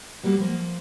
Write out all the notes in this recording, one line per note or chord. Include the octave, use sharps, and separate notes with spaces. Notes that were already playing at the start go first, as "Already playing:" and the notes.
F#3 G3 A#3 F#4
F3 A#3